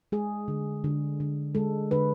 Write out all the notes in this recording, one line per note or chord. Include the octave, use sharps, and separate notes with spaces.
G#3 G#4
D3
D3
D3
G#3 A4
D3 B4